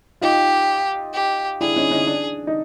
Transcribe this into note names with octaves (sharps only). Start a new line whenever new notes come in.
D#4 F4 G4
G4
D4 E4 G#4
C#4 D#4
C#4 D#4
D4
D#4